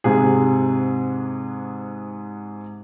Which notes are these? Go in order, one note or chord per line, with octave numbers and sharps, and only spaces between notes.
G#2 C3 G#4